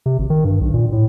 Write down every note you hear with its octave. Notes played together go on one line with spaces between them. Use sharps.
C3
G#1
D#3
G2
B1
A#2
A2